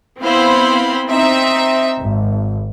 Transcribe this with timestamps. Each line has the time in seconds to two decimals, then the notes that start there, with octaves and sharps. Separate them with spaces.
0.21 B3 C4 E4 C5 F5 B5
1.08 C4 D#4 E5
2.01 G#1